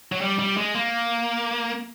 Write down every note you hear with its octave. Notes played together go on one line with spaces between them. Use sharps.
F#3
G3
G3
G#3
A#3